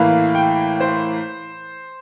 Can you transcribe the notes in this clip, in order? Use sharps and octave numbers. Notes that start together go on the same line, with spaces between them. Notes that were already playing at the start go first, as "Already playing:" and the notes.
Already playing: A2 E3 A#3 F5
G5
C5